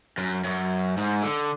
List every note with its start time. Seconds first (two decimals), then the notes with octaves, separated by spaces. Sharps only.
0.18 F#2
0.44 F#2
0.97 G#2
1.23 D3